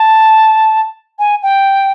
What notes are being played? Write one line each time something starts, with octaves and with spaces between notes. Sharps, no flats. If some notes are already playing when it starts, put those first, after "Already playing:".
Already playing: A5
G#5
G5